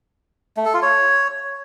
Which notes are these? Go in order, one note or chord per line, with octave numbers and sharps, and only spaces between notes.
A3
A4
F4
C#5